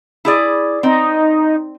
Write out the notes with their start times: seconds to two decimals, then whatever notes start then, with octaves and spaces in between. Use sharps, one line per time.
0.25 E4 G#4 D5
0.83 C4 D#4